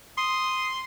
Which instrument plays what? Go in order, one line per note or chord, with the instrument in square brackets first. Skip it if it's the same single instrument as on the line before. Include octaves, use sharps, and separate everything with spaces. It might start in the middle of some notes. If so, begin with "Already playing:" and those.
[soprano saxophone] C6 [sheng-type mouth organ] D#6